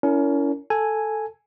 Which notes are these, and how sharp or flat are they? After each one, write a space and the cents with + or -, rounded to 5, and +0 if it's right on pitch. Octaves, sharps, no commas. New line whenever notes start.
C#4 +30 E4 +0 A#4 -10
A4 +0 G#5 +0